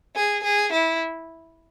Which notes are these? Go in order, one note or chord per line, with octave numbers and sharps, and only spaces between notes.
G#4
G#4
E4